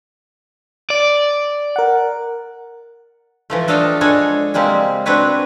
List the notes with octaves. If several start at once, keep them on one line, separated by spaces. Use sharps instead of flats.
D5
A#4 F#5
E3 F3 A3
A3 D4 A4 D#5 F5 G5
G#3 D4 A4 C#5 D#5 G#5
C#3 G3 G#3 A#3 C4
C4 D4 F#4 B4 C#5